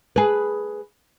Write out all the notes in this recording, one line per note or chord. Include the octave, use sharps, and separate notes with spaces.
G#4 B4